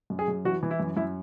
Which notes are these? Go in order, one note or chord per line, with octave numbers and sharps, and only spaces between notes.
F#2
G#4
F#2
E3 F#4
E3
E4
F#2
F#2 E4